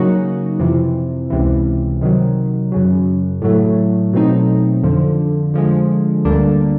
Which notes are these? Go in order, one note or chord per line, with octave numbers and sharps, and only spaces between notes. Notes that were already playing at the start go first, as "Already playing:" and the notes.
Already playing: C#3 F#3 A#3 D#4 F#4
F2 C3 E3
C#2 C3 E3
C3 D#3 F#3
F#2 C#3 F#3
A2 F#3 A3
B2 F#3 A3 C4 D#4
F2 D3 F3
D3 F3 G#3
D2 D3 G3 A#3 D4